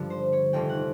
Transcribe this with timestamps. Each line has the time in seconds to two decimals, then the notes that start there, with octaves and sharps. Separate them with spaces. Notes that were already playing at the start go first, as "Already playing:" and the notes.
Already playing: G2 D3 F3
0.10 C5
0.33 C#5
0.53 F1 F2 C3 D#3 G5
0.69 F#5